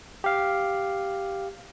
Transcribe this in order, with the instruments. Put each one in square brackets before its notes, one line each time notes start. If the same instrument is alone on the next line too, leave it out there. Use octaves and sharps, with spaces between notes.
[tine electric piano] G4 F5